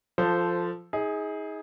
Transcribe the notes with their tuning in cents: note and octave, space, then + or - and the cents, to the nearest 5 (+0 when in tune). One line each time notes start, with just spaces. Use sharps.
F3 +0 A4 +0 C5 -15
D#4 +35 G#4 +0